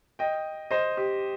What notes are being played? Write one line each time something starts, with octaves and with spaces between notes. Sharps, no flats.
D#5 G5
C5 D#5
G4